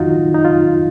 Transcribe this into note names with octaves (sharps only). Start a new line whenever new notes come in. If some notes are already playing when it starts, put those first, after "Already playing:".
Already playing: F2 D#3 F#3 D#4 F4 F#4
D#4
F4